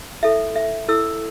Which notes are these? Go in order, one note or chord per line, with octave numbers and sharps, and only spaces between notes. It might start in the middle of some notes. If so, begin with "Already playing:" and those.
E4 A4 E5
E5
E4 A4 E6